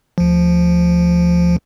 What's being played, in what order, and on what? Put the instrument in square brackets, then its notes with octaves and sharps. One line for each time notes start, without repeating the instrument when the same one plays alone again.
[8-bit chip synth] D2 F3